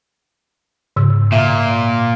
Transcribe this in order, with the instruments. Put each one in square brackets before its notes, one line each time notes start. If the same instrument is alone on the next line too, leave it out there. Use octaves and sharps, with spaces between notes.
[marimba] G#2 C#3 E6
[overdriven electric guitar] A#2 [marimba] E5